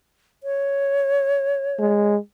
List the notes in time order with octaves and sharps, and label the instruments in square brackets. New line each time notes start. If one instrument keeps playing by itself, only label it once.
[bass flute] C#5
[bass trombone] G#3